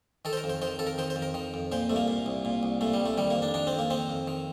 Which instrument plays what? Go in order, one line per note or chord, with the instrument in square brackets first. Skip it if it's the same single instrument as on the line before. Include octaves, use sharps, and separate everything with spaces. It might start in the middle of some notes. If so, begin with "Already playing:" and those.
[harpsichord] D#3 A4
C5
A#4
F2
C5
D#3 C5
F2 A4
A#4
D#3 C5
C5
F2
A#4
D#3
F2
A#2 C5
C2 A3
A#3
A#2
C2
A#2
C2
A#2 A3
G3
C2
A3
D#3 G3
A#3
F2
D4
D#3 D4
C4
F2
A#3
D#3 C4
F2
D#3